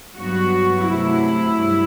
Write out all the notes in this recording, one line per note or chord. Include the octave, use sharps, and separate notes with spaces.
G2 F#3 B3 F#4
C3 F#3 A3 E4
G2 F#3